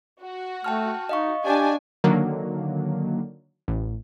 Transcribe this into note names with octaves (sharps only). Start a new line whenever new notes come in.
F#4
A3 G5 A5 F6
D#4 D#5 F5 C#6
D4 G4 G#5
D3 D#3 F#3 A#3
A1